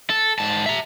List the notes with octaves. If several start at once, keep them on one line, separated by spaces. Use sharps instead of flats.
A4
G#2 A5
E5 A#5